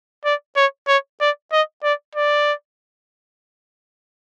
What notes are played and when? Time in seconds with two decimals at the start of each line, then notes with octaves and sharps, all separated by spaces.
0.25 D5
0.56 C#5
0.88 C#5
1.21 D5
1.52 D#5
1.83 D5
2.15 D5